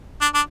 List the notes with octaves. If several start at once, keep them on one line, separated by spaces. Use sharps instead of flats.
D4
D4